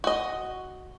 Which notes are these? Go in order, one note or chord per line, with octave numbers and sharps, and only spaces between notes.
F#4 D#5